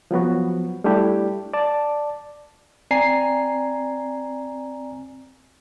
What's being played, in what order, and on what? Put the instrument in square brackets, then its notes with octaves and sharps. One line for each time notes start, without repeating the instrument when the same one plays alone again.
[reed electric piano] F3 F#3 B3 F#4
G3 A3 D4 E4 G4
D5 A5
[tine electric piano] C4 D5 G#5 A#5 C7